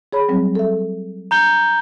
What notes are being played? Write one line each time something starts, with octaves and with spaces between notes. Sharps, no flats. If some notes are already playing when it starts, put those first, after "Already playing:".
G#4 C#5 B5
F#3 G3 C4
A4 E5
A#5 G6 G7